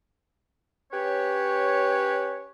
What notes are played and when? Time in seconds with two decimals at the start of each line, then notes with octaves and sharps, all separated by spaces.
0.92 C#4 G4 B4 C#5